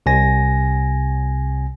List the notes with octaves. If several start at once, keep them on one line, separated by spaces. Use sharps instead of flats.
C2 C3 G#5 A#6